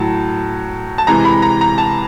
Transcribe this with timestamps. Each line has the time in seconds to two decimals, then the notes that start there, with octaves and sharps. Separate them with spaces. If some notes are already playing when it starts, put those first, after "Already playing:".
Already playing: A2 F#3 A5
0.98 A5
1.07 C3 E3 G#3 A#5
1.25 B5
1.42 A#5
1.61 A#5
1.78 A5